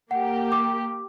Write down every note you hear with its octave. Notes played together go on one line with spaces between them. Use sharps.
A#3 G4 F#5
D6